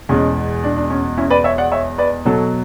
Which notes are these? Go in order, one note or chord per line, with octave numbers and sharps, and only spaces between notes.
E2 B2 G#3 C#4
D4
D4
C#4
C#4 E4
B4 D5
C#5 E5
D5 F#5
C#5 E5
B4 D5
B2 F#3 A4 C#5